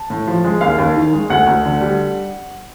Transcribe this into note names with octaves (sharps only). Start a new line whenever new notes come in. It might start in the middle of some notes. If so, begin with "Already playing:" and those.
Already playing: A5
A2
F3
G#3
D#2 F5
D#2
D#3
G#3
D2 F#5
D2
D3
G3